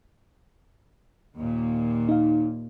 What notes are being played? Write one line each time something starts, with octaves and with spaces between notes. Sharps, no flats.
D#2 A#2
D#4 F5